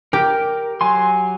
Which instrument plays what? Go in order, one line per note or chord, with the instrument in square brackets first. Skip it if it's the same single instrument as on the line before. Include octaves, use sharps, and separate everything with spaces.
[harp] G4 [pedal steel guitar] A#4
[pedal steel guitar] F#3 G#5 C6